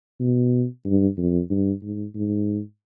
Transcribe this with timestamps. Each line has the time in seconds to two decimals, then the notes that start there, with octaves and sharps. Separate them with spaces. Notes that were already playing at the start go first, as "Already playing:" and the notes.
0.20 B2
0.85 G2
1.17 F2
1.50 G2
1.82 G#2
2.15 G#2